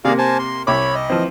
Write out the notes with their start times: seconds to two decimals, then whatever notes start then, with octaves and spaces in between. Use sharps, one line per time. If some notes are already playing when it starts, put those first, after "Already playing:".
0.05 C3 A#3 G#4 D5 F5
0.18 C5 G#5 A5
0.39 C6
0.67 C2 C#5 E5 B5 D6
0.95 D#5
1.10 E3 F3 C4